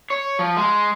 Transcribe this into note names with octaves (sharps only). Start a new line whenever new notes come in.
C#5
F3
G#3